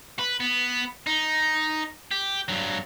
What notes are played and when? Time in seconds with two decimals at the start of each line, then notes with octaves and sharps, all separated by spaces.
0.19 B4
0.40 B3
1.07 D#4
2.11 G4
2.49 G2 F#3